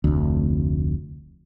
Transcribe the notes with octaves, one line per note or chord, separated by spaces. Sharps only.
F1 D2